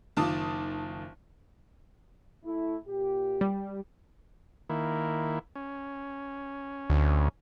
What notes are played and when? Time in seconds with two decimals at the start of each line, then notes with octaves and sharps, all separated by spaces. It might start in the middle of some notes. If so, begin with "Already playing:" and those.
0.17 F#1 D#3 F4 A5 D6 D#6
2.45 A3 E4
2.87 A#2 G4
3.41 G3
4.70 D#3 A#3 E4
5.55 C#4
6.90 D2